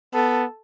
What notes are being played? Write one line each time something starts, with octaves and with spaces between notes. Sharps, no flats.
B3 A4